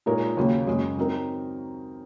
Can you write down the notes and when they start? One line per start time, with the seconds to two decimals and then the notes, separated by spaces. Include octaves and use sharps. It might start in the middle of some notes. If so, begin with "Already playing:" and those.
0.06 A#2 G#3 D#4 A#4 C#5
0.37 D#2 C#3 F#3 A#3
0.67 F#2 C#3 G#3
0.97 F#3 C4 D#4 A#4